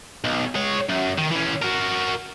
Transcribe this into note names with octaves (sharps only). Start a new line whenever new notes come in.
B1
G#3 C#5
F#2
D#3
E3 C#4
F#4 A#4